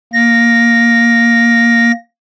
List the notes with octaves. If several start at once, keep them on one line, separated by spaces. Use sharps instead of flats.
A#3 A#6